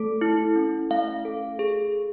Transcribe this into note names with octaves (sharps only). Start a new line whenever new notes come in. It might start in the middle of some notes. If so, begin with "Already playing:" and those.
Already playing: A3 A4
E4
C#4
A3 F5
A4
G#4